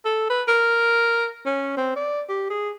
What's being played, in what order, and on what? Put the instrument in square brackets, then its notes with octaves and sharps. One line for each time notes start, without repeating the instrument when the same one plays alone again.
[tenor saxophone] A4
B4
A#4
C#4
C4
D5
G4
G#4